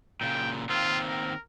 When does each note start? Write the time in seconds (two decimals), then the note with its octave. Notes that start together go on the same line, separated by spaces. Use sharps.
0.21 A#2 C#3 G5
0.70 D#3 A#3 C4 F4
1.08 A#4